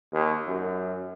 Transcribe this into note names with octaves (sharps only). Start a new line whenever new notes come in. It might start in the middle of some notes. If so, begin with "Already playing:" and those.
D#2
F#2